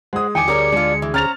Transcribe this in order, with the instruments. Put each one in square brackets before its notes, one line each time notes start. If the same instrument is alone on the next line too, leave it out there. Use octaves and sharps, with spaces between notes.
[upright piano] G#3 D#6 [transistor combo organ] C5 F#5
[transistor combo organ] E2 D#3 [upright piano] G5 G#5 D6 [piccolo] C#7
[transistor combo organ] D2 G#4 [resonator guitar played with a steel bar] G3 A#4 C#5 [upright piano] D6
[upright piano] G#3 [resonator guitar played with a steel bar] D4 F4
[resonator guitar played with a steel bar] E3
[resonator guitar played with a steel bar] C#4 C5 [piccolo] A#5 [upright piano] F6 A6 F7